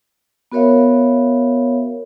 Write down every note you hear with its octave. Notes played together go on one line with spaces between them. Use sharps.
B3 F#4 A#4 C#5 E5 F5